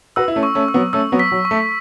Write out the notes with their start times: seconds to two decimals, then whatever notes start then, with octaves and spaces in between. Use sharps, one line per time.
0.16 F#4 B4 E6
0.28 E4
0.36 A3 C#4
0.43 C#6
0.55 A3 C#4
0.68 E6
0.74 F#3 B3
0.93 A3 C#4 E6
1.12 F#3 B3
1.19 B6
1.32 F#3
1.45 C#6
1.51 A3